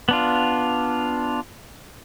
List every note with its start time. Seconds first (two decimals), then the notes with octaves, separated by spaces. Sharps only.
0.09 B3 D4 F4